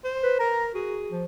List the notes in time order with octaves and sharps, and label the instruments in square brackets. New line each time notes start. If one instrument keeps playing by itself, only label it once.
[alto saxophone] C5
[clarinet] B4
[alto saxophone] A#4 [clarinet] A#5
[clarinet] F#4 [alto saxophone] G#4
[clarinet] F3